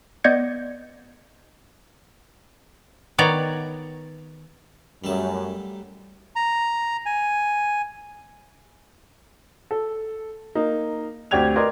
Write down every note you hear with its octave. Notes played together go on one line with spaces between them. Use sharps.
B3 D5 D#5 G6 G#6 C#7
D#3 B3 C#5 D5 A#5
F#2 G3 A3 A5
A#5
G#5
A4
A#3 D#4
D2 C4 G4 D5 G#6 F7
A#4 B4 D5 D#5 C6